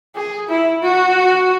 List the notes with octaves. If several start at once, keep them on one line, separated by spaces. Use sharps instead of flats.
G#4
E4
F#4